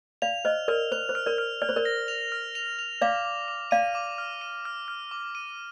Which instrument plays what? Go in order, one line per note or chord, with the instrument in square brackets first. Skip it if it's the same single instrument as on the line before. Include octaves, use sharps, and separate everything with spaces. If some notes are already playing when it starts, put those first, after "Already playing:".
[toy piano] D5 F5 [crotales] F7
[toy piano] C5 D#5 [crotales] F6
[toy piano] A#4 D5 [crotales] F6
[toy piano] C5 [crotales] F7
[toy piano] C5
[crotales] F6
[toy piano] A#4 D5
[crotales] F6
[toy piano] D5 [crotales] F6
[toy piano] C5
A#4 D5
[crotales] A#6
F7
F6
F7
F7
[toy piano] D5 F5 [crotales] D6
[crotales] D6
D6
[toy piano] D5 F5 [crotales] D#7
[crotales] D6
F6
D#7
F6
F6
D6
D#7